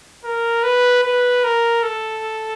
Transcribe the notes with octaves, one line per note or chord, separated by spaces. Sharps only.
A#4
B4
B4
A#4
A4